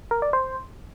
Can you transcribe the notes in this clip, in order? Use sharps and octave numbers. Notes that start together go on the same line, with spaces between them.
A#4
D5
C5